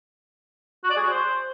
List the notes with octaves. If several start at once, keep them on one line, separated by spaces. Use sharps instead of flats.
F#4
D5
G#4
F#4
C5